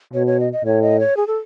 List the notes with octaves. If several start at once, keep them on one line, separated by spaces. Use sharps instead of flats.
B2 C#5
C#5
D#5
D#5
A2 C#5
D#5
C#5
G#4
A4